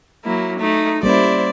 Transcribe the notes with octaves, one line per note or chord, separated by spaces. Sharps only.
F#3 A#3 E4
A3 D#4
G3 A#3 C#4 E4 C5 D5